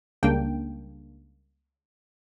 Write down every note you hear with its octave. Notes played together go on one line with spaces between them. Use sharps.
C#2 C#3 G3 A#3 D4 G5